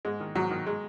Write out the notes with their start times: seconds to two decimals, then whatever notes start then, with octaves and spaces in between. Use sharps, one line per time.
0.05 G#2 G#3
0.20 D#3
0.35 G#2 F#3
0.51 D#3
0.66 G#3